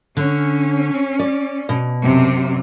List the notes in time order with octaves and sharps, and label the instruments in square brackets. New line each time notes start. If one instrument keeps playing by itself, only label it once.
[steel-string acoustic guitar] D3 [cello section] C#4
[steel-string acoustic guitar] D5
B2
[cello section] F#2 C3